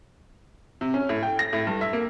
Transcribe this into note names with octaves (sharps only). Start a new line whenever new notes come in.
C3
C#4
A2
G5
A#6
A2
G2
E5
A#3